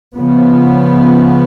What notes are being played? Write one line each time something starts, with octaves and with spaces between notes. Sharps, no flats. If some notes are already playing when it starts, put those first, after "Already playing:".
C#3 F3 B3